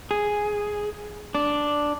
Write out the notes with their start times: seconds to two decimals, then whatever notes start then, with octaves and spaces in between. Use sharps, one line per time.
0.11 G#4
1.35 D4